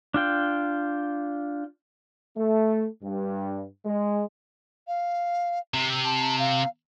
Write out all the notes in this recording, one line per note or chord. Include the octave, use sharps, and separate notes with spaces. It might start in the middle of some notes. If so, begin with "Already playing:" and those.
D4 F4 G5
A3
G2
G#3
F5
C3
A5
F5